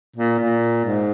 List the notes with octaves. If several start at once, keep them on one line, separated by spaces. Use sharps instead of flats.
A#2
A#2
G#2